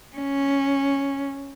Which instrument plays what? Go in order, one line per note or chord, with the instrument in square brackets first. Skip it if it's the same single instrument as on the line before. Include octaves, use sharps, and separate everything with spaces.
[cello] C#4